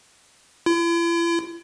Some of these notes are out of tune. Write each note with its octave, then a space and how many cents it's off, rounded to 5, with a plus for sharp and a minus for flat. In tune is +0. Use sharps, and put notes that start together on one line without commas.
E4 +45